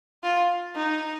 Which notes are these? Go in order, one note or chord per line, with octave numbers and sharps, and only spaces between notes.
F4
D#4